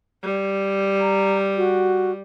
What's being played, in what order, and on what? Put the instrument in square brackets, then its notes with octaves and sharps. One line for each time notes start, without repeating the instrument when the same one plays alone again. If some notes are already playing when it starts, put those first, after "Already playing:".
[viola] G3
[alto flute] A#5
F#4